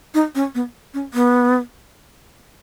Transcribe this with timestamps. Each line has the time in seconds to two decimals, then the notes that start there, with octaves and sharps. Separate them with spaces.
0.14 D#4
0.35 C#4
0.55 B3
0.94 C#4
1.14 B3